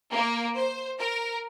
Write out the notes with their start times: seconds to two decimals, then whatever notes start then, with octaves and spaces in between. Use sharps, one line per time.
0.11 A#3
0.56 C5
0.99 A#4